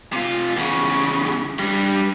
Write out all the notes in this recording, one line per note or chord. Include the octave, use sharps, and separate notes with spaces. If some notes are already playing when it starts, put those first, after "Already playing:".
C3 F4
E2 C#3
G2 G3